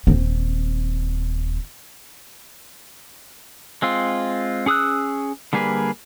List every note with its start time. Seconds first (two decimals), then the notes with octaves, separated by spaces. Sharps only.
0.07 D#1 C4
3.82 G#3 C4 F4
4.66 C#4 G#4 D#6 E6 F#6
5.53 D3 G3 A#3 G#4 B4